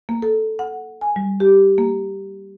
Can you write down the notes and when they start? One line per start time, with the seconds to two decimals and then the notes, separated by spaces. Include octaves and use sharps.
0.09 A#3
0.22 A4
0.59 F#5
1.01 G#5
1.16 G3
1.40 G4
1.78 A#3